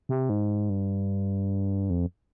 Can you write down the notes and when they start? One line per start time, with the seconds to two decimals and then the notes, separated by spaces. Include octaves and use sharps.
0.09 C3
0.29 G#2
0.70 G2
1.90 F2